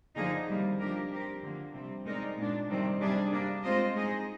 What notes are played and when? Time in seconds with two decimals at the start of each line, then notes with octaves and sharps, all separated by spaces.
0.16 D3 F3 A#3 D#4 G#4
0.48 C3 D#3 G3 A#3
0.79 F3 A#3 D4 G4 A#4
1.11 G3 C4 G4 A#4
1.42 D3 F3 A#3
1.73 C3 G3 C4
2.06 G#3 C4 D#4 A#4 D5
2.37 A#2 G#3 D4
2.69 C3 D#3 G3 C4
3.00 C3 G3 D4 G#4 D5
3.32 G3 A#3 D4
3.63 G#3 C4 F4 C5 D#5
3.95 G#3 C4 D#4 G#4 D#5